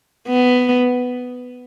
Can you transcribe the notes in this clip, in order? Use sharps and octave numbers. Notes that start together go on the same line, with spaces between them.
B3